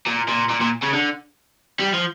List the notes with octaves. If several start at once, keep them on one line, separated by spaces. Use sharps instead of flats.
A#2
A#2
A#2
A#2
C#3
D3
G3
F3